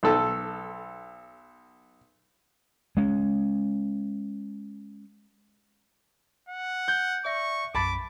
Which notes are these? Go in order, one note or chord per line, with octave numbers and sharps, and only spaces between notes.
B1 A4
G#3 C#4
F#5
G6
D5 E5 C#6 A#6
B1 F#2 A5 B5 D6 A6